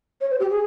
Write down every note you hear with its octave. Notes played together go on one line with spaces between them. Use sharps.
C#5
C5
G4
G#4